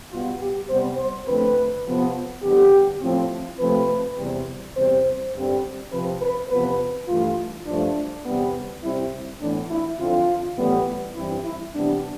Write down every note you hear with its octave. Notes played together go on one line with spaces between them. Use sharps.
B2 G3 B3 F4
G4
C3 G3 B3 C5
C5
F2 D3 A3 C4 B4
F2 C3 F3 B3
F2 D3 G3 B3 G4
A2 F3 C4
C3 F3 A3 C4 B4
E2 C3 G3 C4
E2 C3 G3 C4 C5
G2 D3 G3 C4
C3 F3 C4 B4
B4
E2 C3 F3 B3 B4
G2 E3 A3 F4
G2 F3 A3 D4
E2 C3 G3 B3
C3 G3 C4 E4
A2 E3 B3 D4
E4
F2 D3 F3 C4 F4
A2 E3 G3 B3
G2 E3 G3 C4 E4
E4
C3 E3 G3 B3 D4